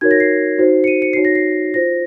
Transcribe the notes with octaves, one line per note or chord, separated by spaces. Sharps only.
D#4 F#4 A#4 C#5 G#6
A#6
C7
D#4 F#4 C5
C#7
D#7
C#7
D#4 F#4 C#5 C7
A#6
C7
F4 C5 A#6